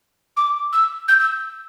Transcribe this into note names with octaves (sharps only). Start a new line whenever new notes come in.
D6
E6
G6
E6